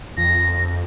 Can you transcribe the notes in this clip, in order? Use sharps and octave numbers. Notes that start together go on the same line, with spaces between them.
F2 A#6